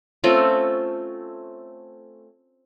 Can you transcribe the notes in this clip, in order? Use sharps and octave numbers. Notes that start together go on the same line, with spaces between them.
A3 C4 C#4 F4